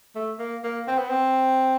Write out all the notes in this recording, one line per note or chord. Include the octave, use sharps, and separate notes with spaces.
A3
A#3
A#3
C4
B3
C4